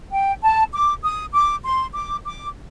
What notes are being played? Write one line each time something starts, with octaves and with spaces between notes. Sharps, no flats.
G5
A5
D6
D#6
D6
C6
D6
D6